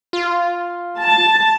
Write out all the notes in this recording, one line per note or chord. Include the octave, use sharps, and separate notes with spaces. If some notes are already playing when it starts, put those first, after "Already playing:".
F4
A5